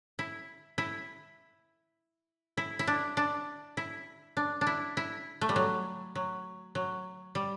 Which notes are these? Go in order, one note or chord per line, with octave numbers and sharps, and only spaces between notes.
E4
E4
E4
E4
D4
D4
E4
D4
D4
E4
E4
A3
G3
F#3
F#3
F#3
G3